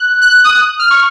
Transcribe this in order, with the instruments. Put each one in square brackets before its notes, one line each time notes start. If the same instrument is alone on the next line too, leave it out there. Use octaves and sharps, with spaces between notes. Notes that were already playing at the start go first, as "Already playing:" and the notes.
Already playing: [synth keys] F#6
F#6
D#6
F6
C#6